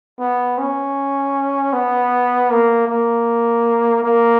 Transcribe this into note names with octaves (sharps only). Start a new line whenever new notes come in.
B3
C#4
B3
A#3
A#3
A#3